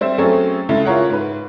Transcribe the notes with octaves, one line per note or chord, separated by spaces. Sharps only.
G3 C4 C5 E5
F#3 A3 C4 C#4 G#4 A4
C#3 G#3 E4 A4
E4 F4 G#4 A#4 C#5 F#5
G#2 B4